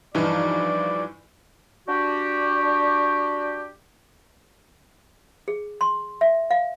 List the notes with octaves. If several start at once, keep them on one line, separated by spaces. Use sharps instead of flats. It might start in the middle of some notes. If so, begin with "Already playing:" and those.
G2 E3 F3 D#4 D5
D4 F#4 G4
G#4
C6
E5
F5